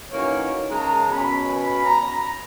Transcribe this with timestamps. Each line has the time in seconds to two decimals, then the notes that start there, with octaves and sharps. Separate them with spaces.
0.12 E3 A#3 C#4 D#4 F#4 C#5
0.71 C#3 G#3 A#4 A5 A#5
1.09 B2 C#4 B5
1.86 A#5